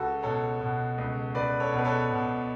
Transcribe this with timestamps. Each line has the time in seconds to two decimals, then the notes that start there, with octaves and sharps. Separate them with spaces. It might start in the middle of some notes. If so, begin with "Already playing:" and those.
Already playing: C#2 F#4 A4
0.23 B2 A4 C#5
0.61 B2
0.98 C#2
1.35 C#2 B4 D5
1.60 A4 C#5
1.73 B2
1.79 B4
1.84 A4 C#5
2.10 B2